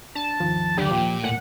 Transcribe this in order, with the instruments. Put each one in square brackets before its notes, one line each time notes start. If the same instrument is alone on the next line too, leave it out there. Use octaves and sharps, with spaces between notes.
[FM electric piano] D4 [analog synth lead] A5
[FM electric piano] D#2 G#2 D#3 [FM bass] F3
[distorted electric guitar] F#2 D5 [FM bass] D3 [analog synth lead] G4
[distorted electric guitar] A#2 [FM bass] F3
[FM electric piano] D#2 A#3 G#5 [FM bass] A2 [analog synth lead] F#5